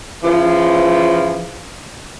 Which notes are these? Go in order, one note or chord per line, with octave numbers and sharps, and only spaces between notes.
C#3 E3 F3